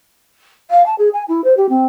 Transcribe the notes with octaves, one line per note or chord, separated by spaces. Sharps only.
F5
A5
G#4
G#5
E4
C5
G4
C4